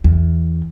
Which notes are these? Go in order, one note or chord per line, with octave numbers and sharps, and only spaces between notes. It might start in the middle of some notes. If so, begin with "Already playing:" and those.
E2